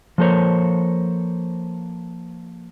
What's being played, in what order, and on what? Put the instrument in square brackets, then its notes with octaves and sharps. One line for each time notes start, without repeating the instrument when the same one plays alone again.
[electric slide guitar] F3 A#3 A4 A#4 C5 C#5